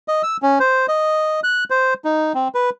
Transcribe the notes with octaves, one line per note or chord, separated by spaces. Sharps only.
D#5
E6
C#4
C5
D#5
F#6
C5
D#4
C4
B4